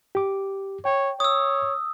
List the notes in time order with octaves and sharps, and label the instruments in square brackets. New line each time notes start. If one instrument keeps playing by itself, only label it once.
[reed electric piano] G4 D6
[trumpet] C#5 [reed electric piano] G5
[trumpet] C#5 [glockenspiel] D#6 E6